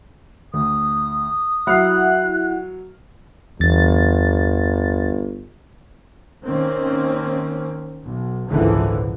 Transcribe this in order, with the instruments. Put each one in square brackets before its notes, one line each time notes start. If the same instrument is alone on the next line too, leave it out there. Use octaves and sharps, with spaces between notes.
[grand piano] D2 [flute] D#6
[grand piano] F#3 F6 C7 [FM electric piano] E4 F#5 [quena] F#6
[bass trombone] G1 [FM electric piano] E2 A6
[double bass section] D#3 A#3 C4 C#4
B1
G#1 C#2 A#2 D3 E3 F3